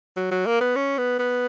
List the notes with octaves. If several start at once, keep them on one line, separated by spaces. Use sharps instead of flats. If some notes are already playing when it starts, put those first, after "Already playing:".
F#3
F#3
A#3
B3
C#4
B3
B3